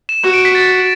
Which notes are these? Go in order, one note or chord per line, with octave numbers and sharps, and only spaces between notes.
E7
F#4
D7
B6
A6